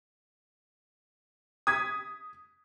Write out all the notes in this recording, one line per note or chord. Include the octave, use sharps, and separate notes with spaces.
D#6 G#6 B6